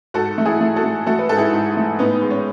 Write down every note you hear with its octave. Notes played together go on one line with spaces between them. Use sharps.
G#2 F#4 A4
A3
E4 G#4
A3
F#4 A4
A3
A3 F#4 A4
B4
G#2 A4
E4 G#4
G#2
A3
A2 B3 D#4
G#3
C#4